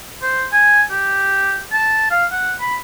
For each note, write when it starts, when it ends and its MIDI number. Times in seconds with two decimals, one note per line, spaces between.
0.22 0.45 72
0.52 0.82 80
0.90 1.59 67
1.73 2.09 81
2.11 2.26 77
2.32 2.54 78
2.61 2.76 83